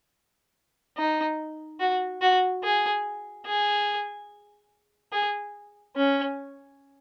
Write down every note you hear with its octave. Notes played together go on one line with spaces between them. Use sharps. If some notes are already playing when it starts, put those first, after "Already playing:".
D#4
F#4
F#4
G#4
G#4
G#4
C#4